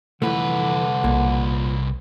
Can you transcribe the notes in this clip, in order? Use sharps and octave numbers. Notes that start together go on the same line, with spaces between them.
C2 F2 D3 E3 A3 B4
B1 A#2